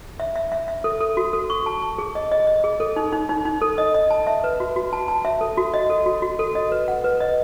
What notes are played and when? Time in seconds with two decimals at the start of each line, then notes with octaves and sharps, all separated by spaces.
0.20 E5
0.36 E5
0.52 E5
0.68 E5
0.84 A4
1.00 A4
1.17 F#4
1.33 A4
1.50 C#6
1.66 A5
1.82 C#6
1.98 G#4
2.15 D#5
2.31 D#5
2.47 D#5
2.64 G#4
2.80 A4
2.96 D#4
3.13 D#4
3.29 D#4
3.45 D#4
3.62 A4
3.78 D#5
3.94 D#5
4.11 A5
4.27 E5
4.44 B4
4.60 F#4
4.76 F#4
4.93 A5
5.08 A5
5.25 E5
5.41 A4
5.57 F#4
5.74 D#5
5.90 A4
6.06 F#4
6.22 F#4
6.39 A4
6.55 D#5
6.72 B4
6.88 F#5
7.04 B4
7.20 D#5